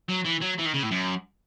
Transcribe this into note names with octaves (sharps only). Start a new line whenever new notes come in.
F#3
E3
F#3
E3
D#3
C#3
A2
F#2